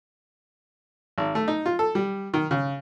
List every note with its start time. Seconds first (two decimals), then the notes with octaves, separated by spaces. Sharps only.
1.18 G#1
1.35 A3
1.48 D#4
1.66 F4
1.79 A4
1.95 G3
2.34 D#3
2.51 C#3